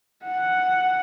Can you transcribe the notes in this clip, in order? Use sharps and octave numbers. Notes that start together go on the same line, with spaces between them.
F#5